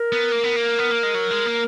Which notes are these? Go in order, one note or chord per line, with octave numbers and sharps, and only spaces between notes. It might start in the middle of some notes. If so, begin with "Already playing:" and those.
Already playing: A#4
B3
A#3
B3
A#3
B3
A#3
G#3
F#3
G#3
A#3